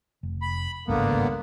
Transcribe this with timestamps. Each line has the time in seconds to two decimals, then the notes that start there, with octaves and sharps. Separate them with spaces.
0.23 F1
0.42 B5
0.88 G#1 C#2 G2 D3 A#3 B3